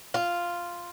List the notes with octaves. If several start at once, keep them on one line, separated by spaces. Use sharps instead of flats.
F4